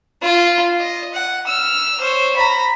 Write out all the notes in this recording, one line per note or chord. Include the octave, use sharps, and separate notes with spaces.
F4
D#5
F#5
E6 F6
C5 C#5
A#5 B5